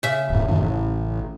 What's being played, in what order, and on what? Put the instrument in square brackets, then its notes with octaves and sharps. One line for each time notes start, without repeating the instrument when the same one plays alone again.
[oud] C#3 E5
[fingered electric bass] D#1 G#2
F#2 A2 D#3
A1